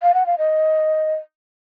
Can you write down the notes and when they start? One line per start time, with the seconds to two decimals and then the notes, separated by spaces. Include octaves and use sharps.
0.03 F5
0.14 F#5
0.26 F5
0.38 D#5